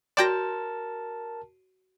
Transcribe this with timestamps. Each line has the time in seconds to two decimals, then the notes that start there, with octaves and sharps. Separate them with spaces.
0.17 F#4 A#4 C#5 D5 G5 A5 C6 A#6